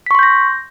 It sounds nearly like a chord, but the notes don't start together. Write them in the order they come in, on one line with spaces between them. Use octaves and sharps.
B6 C#6 C6 G6 A#6